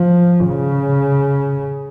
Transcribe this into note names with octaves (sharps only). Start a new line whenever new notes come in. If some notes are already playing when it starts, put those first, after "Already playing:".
Already playing: F3
C#3